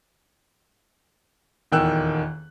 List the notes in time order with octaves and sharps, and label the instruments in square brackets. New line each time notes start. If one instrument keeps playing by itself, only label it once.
[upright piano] D#1 E2 D#3 G5 E6 F#6